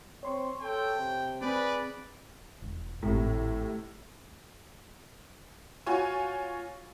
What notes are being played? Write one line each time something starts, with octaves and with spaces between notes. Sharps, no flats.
C4 C#5 C6 C#6
A4 G5
C3
C4 G#4 B4 D5
E1
G#1 A2 C3
F4 F#4 C#5 G#5